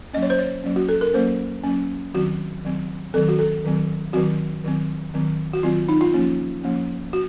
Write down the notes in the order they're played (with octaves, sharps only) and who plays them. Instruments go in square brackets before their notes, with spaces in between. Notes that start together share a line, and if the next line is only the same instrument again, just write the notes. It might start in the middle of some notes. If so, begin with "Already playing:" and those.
[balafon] F#3 A#3 C#4 D#5
C#5
C5
C#5
F#3 A#3 C#4
F#4
A4
A#4
F#3 A#3 C#4 C5
F#3 A#3 C#4
D#3 F#3 C4 F#4
D#3 F#3 C4
D#3 F#3 C4 A4
F#4
A4
D#3 F#3 C4
D#3 F#3 C4 F#4
D#3 F#3 C4
D#3 F#3 C4
F#4
D#3 F#3 C4 F4
D#4
F4
F3 A#3 C#4
F3 A#3 C#4
F#4